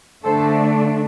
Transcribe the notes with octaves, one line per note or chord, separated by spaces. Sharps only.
D3 A3 D4 A4 C5